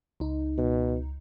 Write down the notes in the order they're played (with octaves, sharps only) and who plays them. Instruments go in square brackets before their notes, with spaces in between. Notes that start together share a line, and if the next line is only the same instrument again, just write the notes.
[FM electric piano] C#2 D#4
[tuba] B2